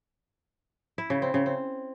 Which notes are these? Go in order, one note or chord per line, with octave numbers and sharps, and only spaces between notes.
E4
C#3
C4
C#3
C4